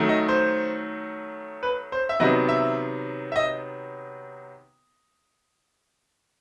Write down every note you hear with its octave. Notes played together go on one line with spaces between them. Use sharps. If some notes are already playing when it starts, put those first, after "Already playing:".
Already playing: D#3 F#3 A3
D#5
C5
B4
C5
E5
C3 D#3 F#3 B3 D#5
E5
E5
D#5